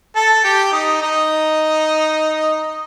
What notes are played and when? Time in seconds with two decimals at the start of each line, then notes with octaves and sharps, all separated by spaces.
0.15 A4 A5
0.44 G4 G5
0.72 D#4 D#5
1.02 D#4 D#5